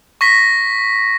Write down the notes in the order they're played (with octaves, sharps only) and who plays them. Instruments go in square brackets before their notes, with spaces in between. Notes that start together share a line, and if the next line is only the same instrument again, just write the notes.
[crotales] C#6 A#6 B6